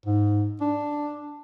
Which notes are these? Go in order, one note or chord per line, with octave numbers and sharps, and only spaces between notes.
G#2
D4